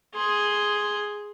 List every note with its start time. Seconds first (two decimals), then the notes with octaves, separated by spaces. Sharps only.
0.15 G#4 C6